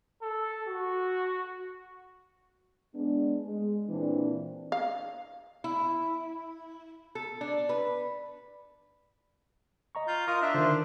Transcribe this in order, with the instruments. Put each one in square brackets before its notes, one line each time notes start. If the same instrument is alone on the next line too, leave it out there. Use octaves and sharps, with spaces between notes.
[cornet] A4
F#4
[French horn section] G#3 B3 D4
G#3
A#2 E3 C4 D4
[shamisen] F5
[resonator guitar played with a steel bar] E4
A4
D4
B4
[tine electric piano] D#5 A#5 C#6
[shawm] F4 [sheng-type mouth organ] G6
[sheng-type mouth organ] F4 D#6 [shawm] A#4 [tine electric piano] C#6
[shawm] D4 [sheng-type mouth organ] E5
[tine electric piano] D3 D#3 [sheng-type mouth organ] C5